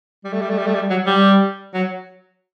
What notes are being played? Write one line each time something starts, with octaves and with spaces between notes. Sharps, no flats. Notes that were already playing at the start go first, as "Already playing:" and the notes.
G3
A3
G3
A3
G3
A3
G3
F#3
G3
F#3